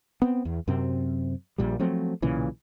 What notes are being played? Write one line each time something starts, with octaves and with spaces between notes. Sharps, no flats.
B3 C4
E2
F#2 C3 C4
A#1 A#2 G3
F3 F#3 A3 C4
B1 A#2 C#3 E3